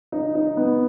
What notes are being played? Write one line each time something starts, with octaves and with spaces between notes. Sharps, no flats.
D#4
D#4
B3